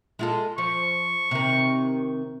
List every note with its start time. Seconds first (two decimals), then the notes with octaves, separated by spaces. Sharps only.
0.19 G#3 F4 A4
0.58 F3 C#6
1.31 C3 D#3